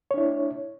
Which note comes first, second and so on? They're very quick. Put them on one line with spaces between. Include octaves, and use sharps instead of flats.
C#5 D4 E4